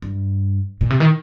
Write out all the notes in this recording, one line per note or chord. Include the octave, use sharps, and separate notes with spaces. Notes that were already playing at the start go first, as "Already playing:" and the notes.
G2
A#2
C3
D#3